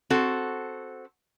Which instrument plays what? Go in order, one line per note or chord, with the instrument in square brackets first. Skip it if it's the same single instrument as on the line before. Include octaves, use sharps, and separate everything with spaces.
[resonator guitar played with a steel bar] C4 F#4 A4